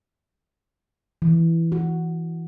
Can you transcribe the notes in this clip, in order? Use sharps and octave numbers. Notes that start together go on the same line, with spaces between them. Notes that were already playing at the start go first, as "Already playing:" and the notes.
E3
F#4